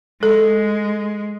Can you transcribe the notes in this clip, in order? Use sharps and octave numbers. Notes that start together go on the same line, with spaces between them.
G#3 A4